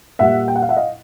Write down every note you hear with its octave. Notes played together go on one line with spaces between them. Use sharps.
A#2 G3 E5 F#5
G5
F#5
F5
E5 F#5
D#5 F5